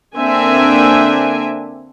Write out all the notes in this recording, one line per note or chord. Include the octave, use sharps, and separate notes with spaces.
D3 A#3 C4 D4 E5 G#5